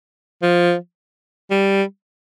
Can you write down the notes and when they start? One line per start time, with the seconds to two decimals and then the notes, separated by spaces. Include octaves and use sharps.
0.43 F3
1.51 G3